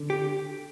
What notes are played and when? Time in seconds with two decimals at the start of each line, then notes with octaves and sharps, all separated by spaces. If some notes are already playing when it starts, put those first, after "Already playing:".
Already playing: D3
0.10 G4